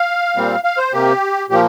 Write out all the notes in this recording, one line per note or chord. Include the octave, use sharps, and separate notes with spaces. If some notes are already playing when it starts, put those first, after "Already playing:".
Already playing: F5
A#2 G3 C4
F5
C5
C3 A#3 G4
A#2 F3 A#3 G4